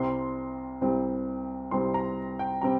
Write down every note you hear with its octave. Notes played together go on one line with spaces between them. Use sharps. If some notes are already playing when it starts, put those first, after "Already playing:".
Already playing: C2 C3 G3 C4 C6
C2 C3 G3 C4
C2 C3 G3 C4 C6
A#5
G5
C3 G3 C4 A#5